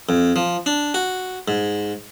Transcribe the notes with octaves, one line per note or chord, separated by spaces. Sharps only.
F2
F3
D4
F#4
G#2